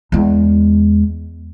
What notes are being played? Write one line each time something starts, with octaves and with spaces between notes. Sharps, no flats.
E2 G#3